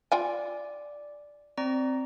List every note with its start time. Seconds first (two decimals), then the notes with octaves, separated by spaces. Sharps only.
0.12 F4 D5 G5 G#5
1.58 C4 D5 A#5